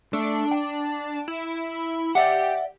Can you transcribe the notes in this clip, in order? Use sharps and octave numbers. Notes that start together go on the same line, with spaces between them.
A3 D4
G5
E4
G4 D5 E5 F#5